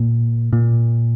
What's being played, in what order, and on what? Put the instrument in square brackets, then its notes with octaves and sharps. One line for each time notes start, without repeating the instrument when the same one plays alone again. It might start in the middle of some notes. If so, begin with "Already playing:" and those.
Already playing: [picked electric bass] A#2
A#2